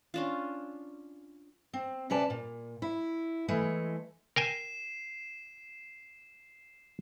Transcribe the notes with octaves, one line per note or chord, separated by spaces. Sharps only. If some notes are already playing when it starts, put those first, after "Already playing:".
C#4 D4 F4
C4
C3 C#4 B4 D5 A5
A#2
E4
E3 G#3 A3
A#4 G5 G#5 C7 E7